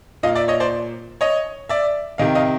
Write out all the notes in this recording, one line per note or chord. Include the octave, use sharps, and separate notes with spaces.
A#2 D#5 F5
D5 E5
C#5 D#5
C5 D5
C#5 D#5
D5 E5
C3 D#3 D#5 F5
D#5 F5